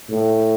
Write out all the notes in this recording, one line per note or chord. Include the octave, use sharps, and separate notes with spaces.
A2